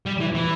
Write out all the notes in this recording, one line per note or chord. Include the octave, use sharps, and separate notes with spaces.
G3
E3
E3